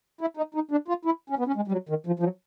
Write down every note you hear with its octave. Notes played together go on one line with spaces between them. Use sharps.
E4
D#4
D#4
D4
F4
E4
C#4
B3
C#4
G#3
G3
F#3
D#3
F3
F3
F#3